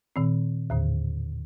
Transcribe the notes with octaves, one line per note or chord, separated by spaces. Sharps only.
A#2 D#3 C4
D#2 A2 D3